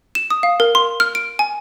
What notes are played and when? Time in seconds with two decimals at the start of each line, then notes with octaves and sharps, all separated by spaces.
0.15 E7
0.30 D#6
0.43 F5
0.60 A#4
0.75 C6
1.00 F6
1.15 D7
1.39 G#5